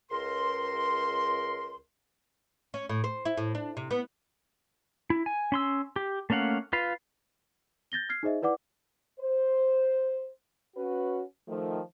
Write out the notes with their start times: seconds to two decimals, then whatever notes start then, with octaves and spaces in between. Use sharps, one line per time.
0.11 C#2 A#4 C6
2.74 C#4
2.89 A2
3.04 C5
3.25 E4
3.37 A2
3.55 D4
3.77 C3
3.91 B3
5.10 E4
5.26 G#5
5.52 C#4 C6 E6
5.96 G4
6.30 A3 A#3 C#4 F5 F#5
6.73 F4 B4 F5
7.92 G6 A6 A#6 G7
8.09 F6 G#6 C7
8.23 D#4 G#4 C5 D#5 E5
8.42 E4 B4 D5 F#5 D6
9.20 C5
10.76 C#4 F#4 B4
11.48 D#3 F3 A3